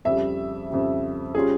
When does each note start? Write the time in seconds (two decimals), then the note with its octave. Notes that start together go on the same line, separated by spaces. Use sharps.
0.05 F2 C#3 G3 E5
0.70 F2 C#3 G3
1.35 G3 C#4 F4 G#4